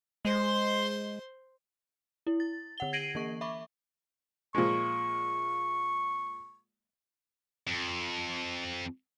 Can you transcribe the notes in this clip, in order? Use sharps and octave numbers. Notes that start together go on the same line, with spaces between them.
G#3 C5 C6
E4
A6
D3 F#5 G7
G#6 A#6 C7 D7 D#7 F#7
E3 A#3 C#6
E5 B5 C#6 D6
A#2 F3 G#3 C#6
F2